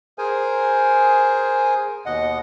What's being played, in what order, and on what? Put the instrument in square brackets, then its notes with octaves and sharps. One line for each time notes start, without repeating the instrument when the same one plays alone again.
[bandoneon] G#4 A#4 C5 G#5
D#2 B2 D#5 F#5